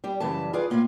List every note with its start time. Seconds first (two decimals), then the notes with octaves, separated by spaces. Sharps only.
0.04 G3 G4
0.20 F#2 C#3 E3 G3 E5 A5
0.53 F4 G#4 B4 D5 F5 G#5
0.70 A2 A#3 F4 E5 F5